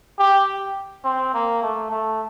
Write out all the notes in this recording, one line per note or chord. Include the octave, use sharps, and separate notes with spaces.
G4
C4
A#3
A3
A3